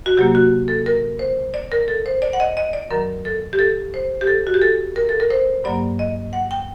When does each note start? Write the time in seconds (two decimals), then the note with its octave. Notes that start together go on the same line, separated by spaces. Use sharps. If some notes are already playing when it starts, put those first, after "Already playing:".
0.06 F#4
0.17 C3 F#3 A#3 G4
0.35 F#4
0.68 A4
0.86 A#4
1.19 C5
1.54 D5
1.72 A#4
1.88 A4
2.06 C5
2.22 D5
2.33 F#5
2.40 D#5
2.57 D#5
2.73 D5
2.91 F#2 D#3 F#3 A#4
3.25 A4
3.53 G4
3.59 A4
3.94 C5
4.21 G4
4.27 A4
4.47 F#4
4.54 G4
4.62 A4
4.96 A#4
5.09 A4
5.20 A#4
5.30 C5
5.64 G2 F#3 A#3 D5
5.99 D#5
6.33 F#5
6.51 G5